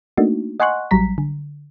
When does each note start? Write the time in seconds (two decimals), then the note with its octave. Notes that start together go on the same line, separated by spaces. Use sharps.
0.17 A3 A#3 D4 D#4 F#4
0.60 D#5 F#5 G#5 C6 C#6 F#6
0.91 A1 F#3 G3 A#5 B6
1.18 D3